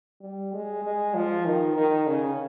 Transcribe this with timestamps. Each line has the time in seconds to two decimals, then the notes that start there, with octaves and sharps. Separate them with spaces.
0.21 G3
0.53 G#3
0.84 G#3
1.15 F3
1.45 D#3
1.76 D#3
2.07 C#3